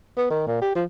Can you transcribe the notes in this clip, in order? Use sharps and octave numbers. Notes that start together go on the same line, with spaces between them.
B3
D#3
A#2
G4
F3